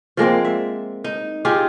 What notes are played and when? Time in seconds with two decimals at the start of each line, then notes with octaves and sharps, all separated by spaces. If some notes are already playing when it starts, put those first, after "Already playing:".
0.17 F3 G#3 A#3 C4
0.45 E5
1.04 D#4
1.45 D#4 F4 G4 G#4